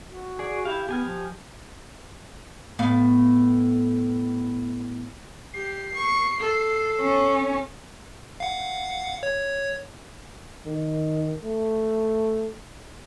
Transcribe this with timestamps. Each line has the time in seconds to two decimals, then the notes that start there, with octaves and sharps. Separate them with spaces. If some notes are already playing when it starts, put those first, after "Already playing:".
0.08 F#4
0.39 G#4 D5
0.65 E4 G4 F5
0.89 B3 G4 G#5 F6
1.05 F3
2.79 A2 B3 F5
5.54 G4 C7
5.94 C#6
6.40 A4
7.01 C#4
8.40 F5 F#5
9.23 C#5
10.66 D#3
11.44 A3